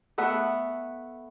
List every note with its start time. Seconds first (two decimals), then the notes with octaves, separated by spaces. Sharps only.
0.18 A3 B3 E5 F#5